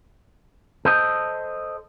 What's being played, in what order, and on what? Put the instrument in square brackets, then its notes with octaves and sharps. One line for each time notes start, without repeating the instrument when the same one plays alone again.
[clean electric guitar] A4 C5 D#5